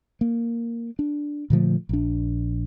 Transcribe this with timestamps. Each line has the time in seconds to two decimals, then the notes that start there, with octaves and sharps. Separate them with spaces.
0.21 A#3
0.99 D4
1.50 A#2 D3 F3 A3
1.89 A#1 D4